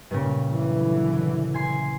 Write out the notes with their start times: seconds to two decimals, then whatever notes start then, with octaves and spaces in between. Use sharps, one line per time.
0.11 G2 A#2 C#3
0.52 D3 E3 F#3
1.54 G#5 C6 G#6